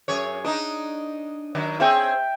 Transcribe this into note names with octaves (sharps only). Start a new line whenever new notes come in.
F#2 G#4 C#5
D4 D#4 D#5
D#3 F#3 D4
C4 G#4 C#5 E5 G5